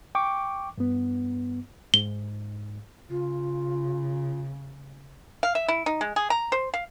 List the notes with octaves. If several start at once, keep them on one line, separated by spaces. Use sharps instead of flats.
G5 C#6 D6
G2 B3
G#2 G7
C#3 F4
F5
E5
E4
D#4
G#3
G#4
A#5
C5
F5